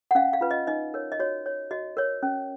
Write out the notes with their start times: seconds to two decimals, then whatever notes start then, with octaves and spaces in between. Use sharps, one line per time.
0.11 F#5
0.15 C#4 F5
0.33 F5
0.41 F4 B4
0.51 D#5
0.67 D#4 D#5
0.94 A#4 C#5
1.12 D#5
1.19 F#4 C#5
1.46 C#5
1.71 F#4 D#5
1.97 A#4 C#5
2.23 C#4